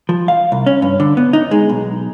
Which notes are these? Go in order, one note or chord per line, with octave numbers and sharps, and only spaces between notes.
F3
F5
C2
C#4
G2
D3
B3
D#4
G#3
B1